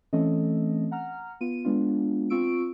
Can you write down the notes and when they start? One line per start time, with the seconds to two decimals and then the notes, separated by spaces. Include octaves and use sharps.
0.13 E3 A3 C4 C#4 A4 D#5
0.91 F#5 A#5 F6
1.41 B3 F4 D#7
1.65 G#3 B3 D4 F4
2.30 C4 F4 C#6 E6 D7